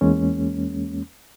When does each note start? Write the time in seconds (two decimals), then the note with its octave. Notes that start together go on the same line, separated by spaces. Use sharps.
0.01 E2 G#3 A#3 C#4